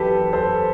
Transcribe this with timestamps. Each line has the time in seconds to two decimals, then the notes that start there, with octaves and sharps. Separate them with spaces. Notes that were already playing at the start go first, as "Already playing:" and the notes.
Already playing: F#2 E3 G4 A4 B4
0.33 A4 C5